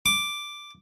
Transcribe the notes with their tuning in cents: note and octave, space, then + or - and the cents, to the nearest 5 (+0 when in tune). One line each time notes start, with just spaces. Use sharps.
D6 +0